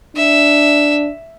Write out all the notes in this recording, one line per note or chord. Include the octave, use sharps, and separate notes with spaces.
D4 E5